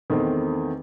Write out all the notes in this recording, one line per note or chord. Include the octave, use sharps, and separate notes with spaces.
E2 D#3 A3 C4